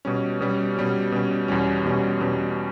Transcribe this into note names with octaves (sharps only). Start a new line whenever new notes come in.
B2 G3 C#4
B2 G3 C#4
B2 G3 C#4
B2 G3 C#4
E2 B2 G3 C#4
E2 B2 G3 C#4
E2 B2 G3 C#4